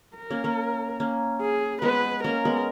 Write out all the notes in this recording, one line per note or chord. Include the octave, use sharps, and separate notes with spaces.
A#4
A#3 C#4
A#3 C#4
A#3 C#4
G#4
G#3 B3 B4
A#3 C#4 A#4
G#3 B3